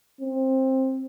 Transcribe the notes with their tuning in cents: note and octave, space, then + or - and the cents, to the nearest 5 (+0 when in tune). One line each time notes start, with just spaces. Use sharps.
C4 +15